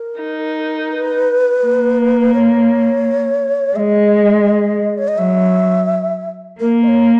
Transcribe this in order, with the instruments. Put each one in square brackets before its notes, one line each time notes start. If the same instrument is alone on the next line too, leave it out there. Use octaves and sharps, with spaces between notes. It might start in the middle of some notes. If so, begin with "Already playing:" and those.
Already playing: [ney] A#4
[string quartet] D#4
[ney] B4
[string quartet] A#3
[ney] C#5
[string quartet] G#3 [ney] D#5 E5
[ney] C#5
D#5
[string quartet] F#3 [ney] E5
[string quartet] A#3 [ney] A#4
[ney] D#5
C#5